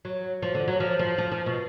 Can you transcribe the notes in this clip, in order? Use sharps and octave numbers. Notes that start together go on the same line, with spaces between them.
F#3
F3
D3
F#3
F3
F3
F3
F3
B2